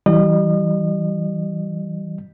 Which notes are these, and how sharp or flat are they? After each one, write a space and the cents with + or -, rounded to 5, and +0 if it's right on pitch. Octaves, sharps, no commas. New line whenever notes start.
E3 -20 G3 -35 D#5 -40